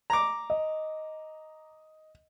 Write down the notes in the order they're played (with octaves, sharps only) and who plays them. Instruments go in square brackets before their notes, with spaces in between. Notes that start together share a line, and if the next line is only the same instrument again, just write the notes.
[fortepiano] A#5 D6
[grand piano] D#5